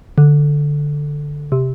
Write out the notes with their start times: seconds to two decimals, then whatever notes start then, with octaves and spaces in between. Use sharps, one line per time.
0.18 D3
1.52 C3